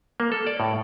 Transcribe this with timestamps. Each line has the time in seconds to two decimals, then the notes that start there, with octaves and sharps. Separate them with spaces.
0.20 A#3
0.32 A4
0.47 D5
0.60 A2